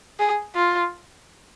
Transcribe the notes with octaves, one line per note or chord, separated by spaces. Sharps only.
G#4
F4